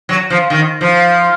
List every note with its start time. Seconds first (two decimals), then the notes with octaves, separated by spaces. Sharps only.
0.09 F#3
0.30 F3
0.50 D#3
0.81 F3